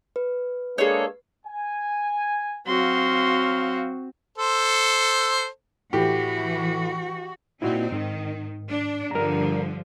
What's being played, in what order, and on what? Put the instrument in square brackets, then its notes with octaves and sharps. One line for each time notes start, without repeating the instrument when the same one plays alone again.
[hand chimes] B4
[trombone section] G#3 A#3 D4 [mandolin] G#4 A4 C#5
[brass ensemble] G#5
[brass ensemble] F#3 F5 [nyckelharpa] C4 F#4 [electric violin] C6
[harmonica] A4 C5
[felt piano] A2 [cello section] E3 [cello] F#4 [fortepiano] G4
[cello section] A#2 C4 D#4 [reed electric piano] E4 F#4
[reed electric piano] G#2 [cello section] D#3
[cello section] D4
[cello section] G2 D3 F3 [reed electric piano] A#4 A#5